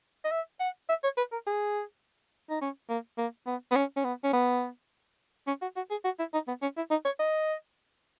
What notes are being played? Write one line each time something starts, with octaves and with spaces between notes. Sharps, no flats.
D#5
E5
F#5
E5
C#5
B4
A#4
G#4
D#4
C#4
A#3
A#3
B3
B3
C#4
C#4
B3
C#4
B3
C#4
F#4
F#4
G#4
F#4
E4
D#4
B3
C#4
E4
D#4
C#5
D#5